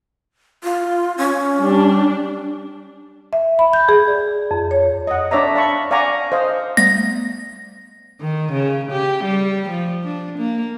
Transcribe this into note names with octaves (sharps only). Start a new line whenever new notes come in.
F4
C#4
G3 D4
E5
B5
G6
G#4
D5
F2
C#5
D#5 F#5
D4 C#5 D5 E5 A#5
F5 A5 B5 C#6
D5 F5 F#5 G#5 A#5 C#6
C5 D#5 F5
G3 A3 B3 A#6
D#3
C#3
G4
G3
F3
D4
A#3